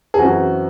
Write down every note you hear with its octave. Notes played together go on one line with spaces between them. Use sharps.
G#4
F#2 E3 C4 F#4